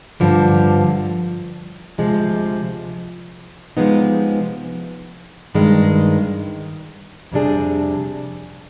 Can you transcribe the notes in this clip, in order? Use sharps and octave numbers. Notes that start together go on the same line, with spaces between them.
G2 D3 F3
D2 C3 F3 G#3
C3 F3 G#3 B3 D#4
G2 D#3 G#3
F2 C3 G3 D4 G#4